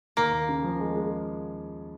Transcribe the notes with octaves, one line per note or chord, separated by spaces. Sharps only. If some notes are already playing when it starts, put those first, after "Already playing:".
D#2 A#3
D#2
C#3
F3
G#3
G#3